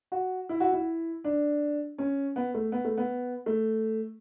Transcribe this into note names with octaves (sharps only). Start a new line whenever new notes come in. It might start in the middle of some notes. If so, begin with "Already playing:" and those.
F#4
E4
F#4
E4
D4
C#4
B3
A3
B3
A3
B3
A3